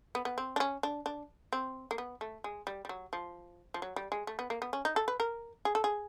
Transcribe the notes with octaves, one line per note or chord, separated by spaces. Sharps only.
B3
B3
C4
D4
C#4
D4
D4
C4
A#3
B3
A3
G#3
G3
G3
F#3
F3
F3
F#3
G3
G#3
A3
B3
A#3
B3
C#4
D#4
A4
B4
A#4
G#4
A4
G#4